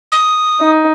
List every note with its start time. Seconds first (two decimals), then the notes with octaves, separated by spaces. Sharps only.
0.12 D#6
0.60 D#4